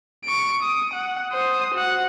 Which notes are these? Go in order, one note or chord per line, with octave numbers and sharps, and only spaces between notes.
C#6 D7
D#6
F#5
C5 D#6
F#4 F#5